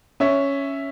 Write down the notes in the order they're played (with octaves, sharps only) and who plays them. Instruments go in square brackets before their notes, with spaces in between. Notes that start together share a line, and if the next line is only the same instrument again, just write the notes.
[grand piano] C#4 [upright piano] C#5 E5